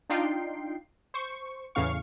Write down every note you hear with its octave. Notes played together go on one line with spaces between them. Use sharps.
D4 D#4 F4 G5 C7
C5 C#6
E2 A2 C#3 F5 C#6